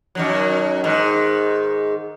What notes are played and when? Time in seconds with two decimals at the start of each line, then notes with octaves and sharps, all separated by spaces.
0.15 F#2 D#3 F#3
0.84 G#2 D#3